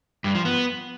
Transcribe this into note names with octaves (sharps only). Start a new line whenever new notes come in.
G2
F3
B3